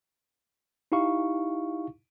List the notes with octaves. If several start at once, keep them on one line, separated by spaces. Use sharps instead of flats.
D#4 E4 G4 F5 C#6